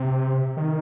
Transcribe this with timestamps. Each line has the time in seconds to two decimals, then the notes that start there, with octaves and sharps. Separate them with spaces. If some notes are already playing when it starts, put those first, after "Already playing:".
Already playing: C3
0.57 D#3